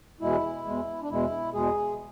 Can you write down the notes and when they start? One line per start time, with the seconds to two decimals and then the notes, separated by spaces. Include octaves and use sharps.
0.21 E2 B2 G#3 E4
0.65 E2 B2 G#3
1.03 D4
1.09 E2 B2 G#3 E4
1.53 E2 B2 G#3 G#4